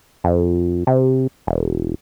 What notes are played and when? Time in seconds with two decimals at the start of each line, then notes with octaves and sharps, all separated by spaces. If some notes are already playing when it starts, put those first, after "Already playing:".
0.24 F2
0.87 C3
1.47 E1